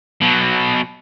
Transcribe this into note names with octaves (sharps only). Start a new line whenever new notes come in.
B2 F#3